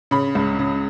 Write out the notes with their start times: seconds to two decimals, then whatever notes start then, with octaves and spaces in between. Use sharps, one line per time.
0.11 C#3 B5
0.35 C#2
0.59 C#3